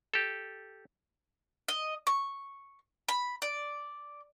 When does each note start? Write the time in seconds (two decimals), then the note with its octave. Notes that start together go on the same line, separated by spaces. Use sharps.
0.14 G4 A4
1.68 D#5
2.07 C#6
3.08 B5
3.42 D5